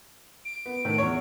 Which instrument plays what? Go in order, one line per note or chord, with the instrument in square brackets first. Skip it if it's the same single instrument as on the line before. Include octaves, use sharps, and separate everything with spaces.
[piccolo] D7
[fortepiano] B3
A2 D#3
E2 C#5